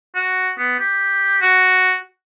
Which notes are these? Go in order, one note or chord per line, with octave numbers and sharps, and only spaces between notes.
F#4
B3
G4
F#4